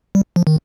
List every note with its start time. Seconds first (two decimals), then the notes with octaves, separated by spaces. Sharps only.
0.15 G3
0.36 F3
0.47 D#3